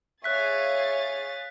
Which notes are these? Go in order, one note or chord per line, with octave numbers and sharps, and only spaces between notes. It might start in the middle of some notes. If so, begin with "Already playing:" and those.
G#4 C#5 E5 F5 F#6 A6 B6